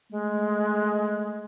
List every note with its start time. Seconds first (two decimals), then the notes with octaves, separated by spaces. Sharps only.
0.11 G#3 A3